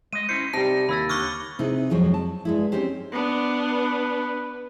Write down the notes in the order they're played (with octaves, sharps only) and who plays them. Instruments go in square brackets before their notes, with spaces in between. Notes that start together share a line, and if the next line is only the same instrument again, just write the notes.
[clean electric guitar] G#3 D#5 [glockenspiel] D#7
[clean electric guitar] C#4 E4 C5 [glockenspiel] C#7
[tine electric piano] C3 G3 [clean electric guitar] D#4 [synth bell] A5
[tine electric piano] D#2 A#6 [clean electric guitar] E4 [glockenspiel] B5 E6 A6
[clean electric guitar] D3 [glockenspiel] C#6 G7 [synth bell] D6 E6 F6
[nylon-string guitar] C3 D#4 E4 G#4 B4
F2 F3 F#3 G#3 F4
A5
G2 G#3 E4
C4 C#4 D#4 G4 C5
[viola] B3 D4
[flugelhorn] B4